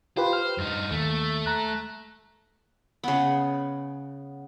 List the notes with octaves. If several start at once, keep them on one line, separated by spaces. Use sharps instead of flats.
F4 G4 B4 C5
F6
G2 D#4
D#2 A3
A#5 F#6
C#3 B3